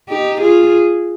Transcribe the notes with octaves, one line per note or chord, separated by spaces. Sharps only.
D#4 G4
F4 G#4